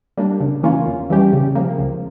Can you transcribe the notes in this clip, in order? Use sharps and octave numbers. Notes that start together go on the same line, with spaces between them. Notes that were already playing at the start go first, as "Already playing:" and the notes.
G3 A#3 D4
C#3
E3 A#3 C#4 F4
E2
E3 G3 C#4 G4
C#3
F3 A#3
C#2